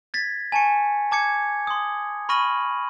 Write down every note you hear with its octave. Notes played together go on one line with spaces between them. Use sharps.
G#6 A6 B6
G#5 A5 C#6 C#7
A5 D6 G#6 C#7
C6 D#6
B5 C#6 F6 A#6 D#7 F#7